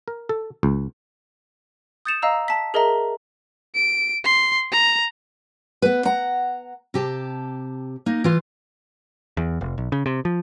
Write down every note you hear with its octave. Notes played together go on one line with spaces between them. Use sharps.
A#4
A4
C#2
D#6 G6 A6 C#7 E7 F7
D#5 F5 A#5 E6
A5 B6
G#4 A#4 D#5 E5 A#5
D7
C6
A#5
B3 B4
F#5 A#5
C3 G4 A5
A#3 D#4
E3 F4
E2
F1
B1
C#3
C3
F3